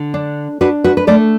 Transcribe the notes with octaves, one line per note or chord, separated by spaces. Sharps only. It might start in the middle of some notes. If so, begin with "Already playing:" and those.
Already playing: D3
D4
D4 F#4 B4
F#4 B4
B4
A3 A4 D5